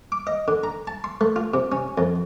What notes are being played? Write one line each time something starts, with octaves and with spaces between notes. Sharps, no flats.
D6
D#5
D3
A#5
A5
C6
A3
F4
C3
C#4
F2